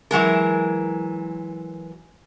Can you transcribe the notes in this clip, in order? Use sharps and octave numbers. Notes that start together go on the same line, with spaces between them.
E3 F#3 G#3 A#4